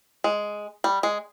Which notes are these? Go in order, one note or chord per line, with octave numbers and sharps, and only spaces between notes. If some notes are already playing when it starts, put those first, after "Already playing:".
G#3
G3
G#3